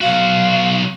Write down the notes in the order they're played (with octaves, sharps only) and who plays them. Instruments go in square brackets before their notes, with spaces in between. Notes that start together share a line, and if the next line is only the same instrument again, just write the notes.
[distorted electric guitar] B1 F#4 [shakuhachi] F5